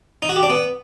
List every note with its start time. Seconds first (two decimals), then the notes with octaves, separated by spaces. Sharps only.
0.22 D#4
0.29 F#4
0.36 G4
0.43 D4
0.50 B3